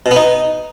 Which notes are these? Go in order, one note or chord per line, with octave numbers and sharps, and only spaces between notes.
B2
B3
D#4